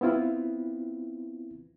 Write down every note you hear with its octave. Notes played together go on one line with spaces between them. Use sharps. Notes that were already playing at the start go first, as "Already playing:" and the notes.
B3 C4 E4 F4